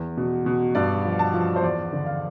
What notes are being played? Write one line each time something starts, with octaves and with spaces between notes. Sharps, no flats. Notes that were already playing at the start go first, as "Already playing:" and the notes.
Already playing: E2
B2
B2
G2 D5
F3
A5
F3
C5
E2 D5
D3
F5